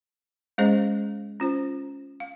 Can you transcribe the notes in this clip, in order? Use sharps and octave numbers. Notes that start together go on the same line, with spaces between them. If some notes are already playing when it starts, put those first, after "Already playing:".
G#3 C#4 G#4 C5 D#5
C#4 F4 C5
F5